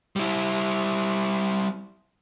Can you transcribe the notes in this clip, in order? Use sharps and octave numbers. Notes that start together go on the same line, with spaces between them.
G3 E4